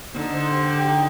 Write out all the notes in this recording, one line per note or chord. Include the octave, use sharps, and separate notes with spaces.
D3 D#4
C5
G4
G5
D#4